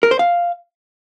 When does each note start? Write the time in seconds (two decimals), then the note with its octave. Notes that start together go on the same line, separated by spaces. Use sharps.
0.03 A#4
0.11 C5
0.19 F5